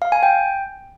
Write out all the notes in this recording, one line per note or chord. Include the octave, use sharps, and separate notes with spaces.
F5
G#5
G5